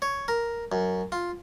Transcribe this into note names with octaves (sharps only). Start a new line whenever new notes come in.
C#5
A#4
F#2
F4